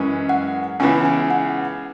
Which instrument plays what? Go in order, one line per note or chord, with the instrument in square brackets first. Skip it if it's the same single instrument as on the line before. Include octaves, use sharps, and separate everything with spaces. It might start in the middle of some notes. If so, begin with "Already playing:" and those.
Already playing: [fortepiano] F#2 E3 G#3 C#4
[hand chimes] F#5
[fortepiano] C#2 C#3 E3 B3 [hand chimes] G#5
[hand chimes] G#5
F#5